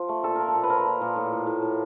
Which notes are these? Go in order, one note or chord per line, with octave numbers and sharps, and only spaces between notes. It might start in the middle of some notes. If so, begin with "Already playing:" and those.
Already playing: F3
A3
A#2 A4
F3 A#4
A4
A#2
B4
F3 A#4
A#2
A#2
A2
A2
A2
A2